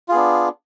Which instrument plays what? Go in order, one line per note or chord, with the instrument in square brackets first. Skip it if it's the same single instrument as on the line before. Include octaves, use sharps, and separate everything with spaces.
[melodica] F4
G#4
B3
D4